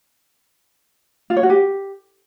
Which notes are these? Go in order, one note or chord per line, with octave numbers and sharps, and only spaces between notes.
F4
C#5
F#4
G4